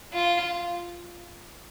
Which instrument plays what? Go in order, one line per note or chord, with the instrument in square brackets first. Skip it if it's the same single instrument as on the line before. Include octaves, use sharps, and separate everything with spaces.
[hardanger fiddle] F4